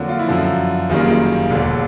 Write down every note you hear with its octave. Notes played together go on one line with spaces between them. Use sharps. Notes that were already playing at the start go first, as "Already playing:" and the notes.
Already playing: F2 D3 F#3 A#3 F#4
F4
E4
F#2 D3 F3
F#1 F#2 D#3 G3 A#3 F4
G#4
F4
E1 D#2 D3